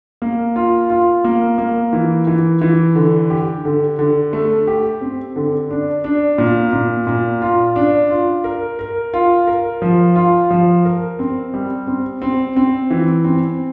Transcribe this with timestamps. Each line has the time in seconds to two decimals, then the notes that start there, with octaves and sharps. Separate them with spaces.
0.22 A#3
0.56 F4
0.90 F4
1.24 A#3
1.58 A#3
1.93 E3
2.27 E3
2.62 E3
2.95 D3
3.30 G4
3.65 D3
3.99 D3
4.33 A3
4.67 G4
5.01 C4
5.36 D3
5.71 D4
6.04 D4
6.38 A#2
6.73 A#2
7.07 A#2
7.42 F4
7.76 D4
8.10 F4
8.44 A#4
8.79 A#4
9.14 F4
9.47 A#4
9.82 F3
10.16 F4
10.50 F3
10.85 A#4
11.19 C4
11.54 G3
11.87 C4
12.22 C4
12.57 C4
12.91 E3
13.25 C4